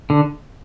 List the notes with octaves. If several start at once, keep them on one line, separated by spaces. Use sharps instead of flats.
D3